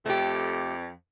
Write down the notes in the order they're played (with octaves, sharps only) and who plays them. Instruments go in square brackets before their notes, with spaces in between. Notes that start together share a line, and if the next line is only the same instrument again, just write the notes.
[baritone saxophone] F2 [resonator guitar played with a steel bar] A3 G4